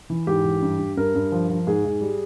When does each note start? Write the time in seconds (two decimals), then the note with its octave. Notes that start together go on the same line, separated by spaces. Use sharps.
0.10 E3
0.27 G#2 G4
0.45 E3
0.62 G2
0.79 G2
0.97 G2 A#4
1.15 G2
1.32 F3
1.49 F3
1.67 G#2 G#4
1.85 G#2
2.01 G3